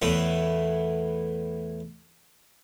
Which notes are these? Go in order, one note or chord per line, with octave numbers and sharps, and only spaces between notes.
E2 A2 E3 A3 B3